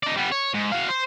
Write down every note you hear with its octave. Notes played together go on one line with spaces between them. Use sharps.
D#4 D5
G3 B3
C#5
G#2
F#4 F5
C5